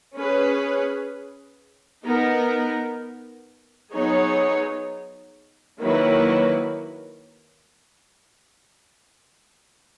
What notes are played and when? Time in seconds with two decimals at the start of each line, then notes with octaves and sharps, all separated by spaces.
0.15 C#4 G#4 B4
2.03 B3 D#4 A#4
3.92 F#3 B3 D#4 G#4 C#5
5.80 D#3 F#3 A#3 E4 B4